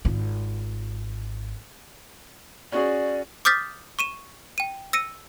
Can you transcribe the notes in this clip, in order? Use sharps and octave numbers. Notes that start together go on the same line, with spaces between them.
G#1 F4
C#4 F#4 G#4 D5
D6 D#6 F6 G6 A6 B6
C#6 D#7 E7
G5 D#7
E6 A#6 C#7 D#7